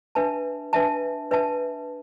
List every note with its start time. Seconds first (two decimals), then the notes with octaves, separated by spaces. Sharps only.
0.15 D4 B4 E5 A5
0.73 D4 B4 E5 A5
1.31 D4 B4 E5 A5